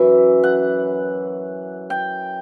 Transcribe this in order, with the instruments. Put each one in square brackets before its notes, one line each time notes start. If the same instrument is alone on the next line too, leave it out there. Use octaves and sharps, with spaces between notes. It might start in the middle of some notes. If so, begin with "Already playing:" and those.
Already playing: [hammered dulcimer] F#2 E3 E5
F#5
G5